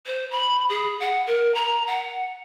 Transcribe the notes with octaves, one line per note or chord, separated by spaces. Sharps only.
C5
B5
G#4
F#5
A#4
A#5
F#5